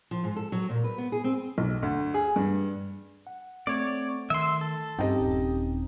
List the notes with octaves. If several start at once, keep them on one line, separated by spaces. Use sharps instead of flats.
F3
G#2
A4
F#3
A#2
B4
B3
G#4
C4
B1
D2
G#4
G2
F#5
A3 C4 C#5 D5
D#3 E5 C6
A4
G2 C4 C#4 D#4 G4 D#5 G5
D#1